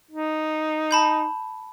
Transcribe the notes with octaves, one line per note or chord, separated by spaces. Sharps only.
D#4
A5 B5 G6